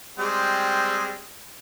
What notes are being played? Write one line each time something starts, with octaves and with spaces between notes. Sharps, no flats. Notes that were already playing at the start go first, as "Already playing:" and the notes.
G3 G#3 C4